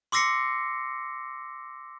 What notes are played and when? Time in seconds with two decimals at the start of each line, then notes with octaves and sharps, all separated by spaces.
0.12 C6 D6 E6 A#6 C7 C#7